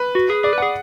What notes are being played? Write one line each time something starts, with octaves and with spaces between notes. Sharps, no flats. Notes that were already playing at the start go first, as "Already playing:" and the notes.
Already playing: B4
F#4
G#4
G#4 D5
B4
G#4 F#5